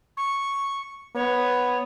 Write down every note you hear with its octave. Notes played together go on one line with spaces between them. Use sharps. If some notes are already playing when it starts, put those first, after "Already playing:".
C#6
B3 C#5